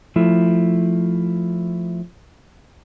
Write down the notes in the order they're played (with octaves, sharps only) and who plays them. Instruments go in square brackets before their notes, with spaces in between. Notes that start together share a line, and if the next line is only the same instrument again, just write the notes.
[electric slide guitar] F3 A3 E4